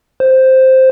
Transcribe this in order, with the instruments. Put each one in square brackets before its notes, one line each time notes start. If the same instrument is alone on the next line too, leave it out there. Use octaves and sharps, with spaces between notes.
[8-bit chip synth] C5